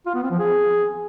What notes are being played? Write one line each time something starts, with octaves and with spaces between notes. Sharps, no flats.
F4
B3
C4
F3
G#4